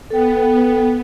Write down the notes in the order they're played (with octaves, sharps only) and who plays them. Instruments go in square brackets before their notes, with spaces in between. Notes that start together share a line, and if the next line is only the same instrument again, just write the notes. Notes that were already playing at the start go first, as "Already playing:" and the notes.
[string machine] B3 [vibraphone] A4 G5